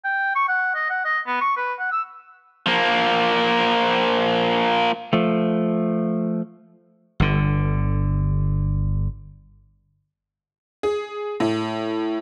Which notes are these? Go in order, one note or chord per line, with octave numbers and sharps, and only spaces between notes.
G5
C#6
F#5
D#5
F#5
D#5
B3
C#6
B4
F#5
E6
F3 A#3
F3 A3
G1 D3
G#4
A2